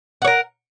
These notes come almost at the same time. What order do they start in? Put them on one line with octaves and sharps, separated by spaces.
F#5 C#5 A#4